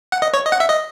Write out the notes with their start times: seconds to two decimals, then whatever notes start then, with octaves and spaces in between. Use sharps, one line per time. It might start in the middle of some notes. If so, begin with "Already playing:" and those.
0.12 F#5
0.22 D#5
0.33 C#5
0.45 D#5
0.52 F#5
0.60 E5
0.69 D#5